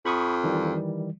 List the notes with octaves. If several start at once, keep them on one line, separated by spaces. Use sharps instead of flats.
F2 B5 C#6 D#6
D#3 E3 G3